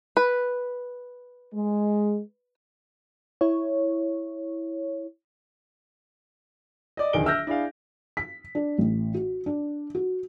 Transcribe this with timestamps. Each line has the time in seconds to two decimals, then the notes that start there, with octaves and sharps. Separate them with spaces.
0.17 B4
1.55 G#3
3.41 E4 C#5
6.97 D5 D#5
7.13 D1 A#1 D#3 G#4 D7 G7
7.26 E5 E6 F6 G6 A#6
7.47 D4 E4 G#4 F5
8.17 B6
8.55 D4
8.78 A1
9.14 F#4
9.46 D4
9.95 F#4